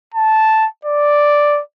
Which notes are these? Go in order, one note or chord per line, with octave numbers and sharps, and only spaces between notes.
A5
D5